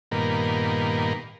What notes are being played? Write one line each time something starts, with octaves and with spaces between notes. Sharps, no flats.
G2 A#2 D#3 A#3 B3